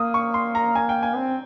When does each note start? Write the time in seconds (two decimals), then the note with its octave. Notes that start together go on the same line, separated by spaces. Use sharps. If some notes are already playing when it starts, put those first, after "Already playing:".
Already playing: A#3 D#6
0.14 C#6
0.34 C6
0.55 A#5
0.75 G#5
0.89 G5
1.03 G#5
1.16 C4